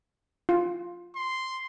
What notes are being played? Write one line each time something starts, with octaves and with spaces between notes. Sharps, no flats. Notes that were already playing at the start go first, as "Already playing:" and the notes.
F4
C6